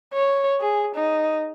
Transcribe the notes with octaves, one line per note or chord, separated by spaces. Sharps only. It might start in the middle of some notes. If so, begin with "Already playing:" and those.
C#5
G#4
D#4